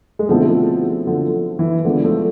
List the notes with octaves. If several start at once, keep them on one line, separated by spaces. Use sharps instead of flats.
G#3
B2 D3 F3 A3 C4 E4 A4
D3 F3
E3
D3 F3 G#3 B3 D4 G#4 D5
F3 A3